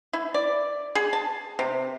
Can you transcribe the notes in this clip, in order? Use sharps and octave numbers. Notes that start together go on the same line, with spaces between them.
E4
D5
G#4
A5
C3